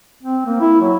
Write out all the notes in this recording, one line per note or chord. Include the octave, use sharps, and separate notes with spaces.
C4
A#3
E4
F#3